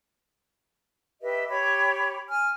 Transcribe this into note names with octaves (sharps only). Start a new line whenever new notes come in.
G4 B4 D#5 E5
G4 C#5 B5
G#5 F6